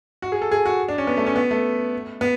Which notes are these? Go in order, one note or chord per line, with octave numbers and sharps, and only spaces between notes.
F#4
G#4
A4
G#4
F#4
D4
C#4
B3
A3
C#4
B3
A3
B3